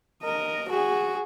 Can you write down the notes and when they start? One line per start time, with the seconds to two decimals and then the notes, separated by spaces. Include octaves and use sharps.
0.22 A#4 D#5
0.69 F#4 G#4